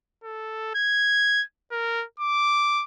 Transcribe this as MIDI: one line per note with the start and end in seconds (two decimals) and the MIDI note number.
0.24 0.71 69
0.75 1.43 92
1.71 2.05 70
2.20 2.84 86